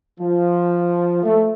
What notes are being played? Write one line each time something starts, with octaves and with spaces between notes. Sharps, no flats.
F3
A3